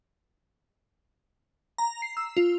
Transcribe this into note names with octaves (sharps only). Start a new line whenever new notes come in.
A#5
C7
E6
F4